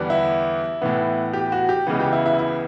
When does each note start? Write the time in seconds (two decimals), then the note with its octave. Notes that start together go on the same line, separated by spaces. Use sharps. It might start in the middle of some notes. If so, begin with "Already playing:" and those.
Already playing: E2 D3 G3 B3
0.10 E4
0.82 A2 E3 B3
1.33 G4
1.52 F#4
1.69 G4
1.87 C#2 C#3 E3 B3
2.00 G4
2.13 E4
2.26 E4
2.39 E4